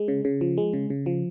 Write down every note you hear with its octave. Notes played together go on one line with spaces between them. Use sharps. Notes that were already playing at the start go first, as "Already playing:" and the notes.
Already playing: G#3
C#3
C#3
F3
G#3
C#3
C#3
F3